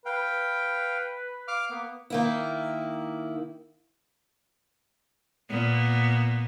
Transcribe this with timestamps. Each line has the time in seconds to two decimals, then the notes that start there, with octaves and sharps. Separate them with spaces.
0.06 B4 F5 G5
1.48 F5 D6 F6
1.70 A#3 B3
2.10 D#3 A#3 E4
5.49 A#2 B3